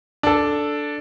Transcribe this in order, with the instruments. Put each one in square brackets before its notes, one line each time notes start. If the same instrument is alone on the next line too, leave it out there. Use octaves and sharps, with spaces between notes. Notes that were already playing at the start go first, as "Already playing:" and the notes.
[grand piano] D4 A4